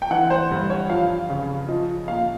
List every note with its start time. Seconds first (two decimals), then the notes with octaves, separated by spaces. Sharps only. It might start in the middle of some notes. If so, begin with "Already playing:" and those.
0.02 G5
0.11 E3 F#5
0.30 C5
0.51 G2
0.70 C#5
0.90 F3 F5
1.30 C#3
1.68 F3 D#5
2.08 A#2 F5